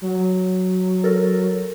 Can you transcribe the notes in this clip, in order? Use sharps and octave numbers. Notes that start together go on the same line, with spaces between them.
F#3
A4 A#4